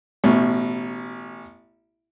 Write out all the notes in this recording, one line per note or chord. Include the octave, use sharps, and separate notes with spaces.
A1 B2